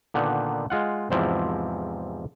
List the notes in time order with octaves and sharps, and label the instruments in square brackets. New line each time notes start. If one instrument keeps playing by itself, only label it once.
[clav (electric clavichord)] A#2 D3 D#3 B3 D#4
G#3 F4 F#5
E2 G#2 C3 F3 C4 E4